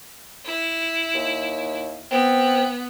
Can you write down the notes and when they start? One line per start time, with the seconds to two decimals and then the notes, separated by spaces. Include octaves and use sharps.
0.46 E4
1.14 D#2
2.11 B3 C4